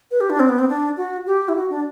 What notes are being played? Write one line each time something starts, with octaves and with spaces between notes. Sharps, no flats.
B4
G4
D4
C4
B3
C4
D4
F#4
G4
E4
F#4
D4